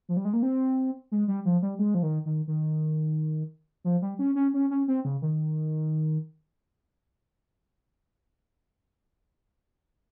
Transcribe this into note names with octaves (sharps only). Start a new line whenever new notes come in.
F3
G3
G#3
A#3
C4
G#3
G3
F3
G3
G#3
F3
D#3
D#3
D#3
F3
G3
C#4
C#4
C#4
C#4
C4
C#3
D#3